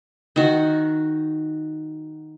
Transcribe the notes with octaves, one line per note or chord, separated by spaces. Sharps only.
D#3 F#4